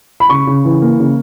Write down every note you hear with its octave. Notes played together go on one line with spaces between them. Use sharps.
B5
C#3 C#6
C#3
E3
A#3
C#3